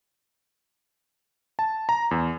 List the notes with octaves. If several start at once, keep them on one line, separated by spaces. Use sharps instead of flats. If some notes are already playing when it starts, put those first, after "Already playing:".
A5
A#5
E2